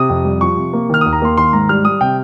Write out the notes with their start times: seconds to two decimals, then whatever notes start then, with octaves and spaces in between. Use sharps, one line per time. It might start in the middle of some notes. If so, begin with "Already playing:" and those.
Already playing: C3 D#6
0.09 F2
0.25 G3
0.41 F3 C#6
0.57 C3
0.73 A#3
0.90 D#3 F6
1.01 D#2 D#6
1.13 A#5
1.22 A#3 C6
1.37 D#3 C6
1.53 G#2 A#5
1.69 G3 F6
1.85 G3 D#6
2.01 C3 G5